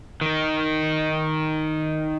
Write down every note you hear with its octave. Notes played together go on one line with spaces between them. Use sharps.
D#3 D#4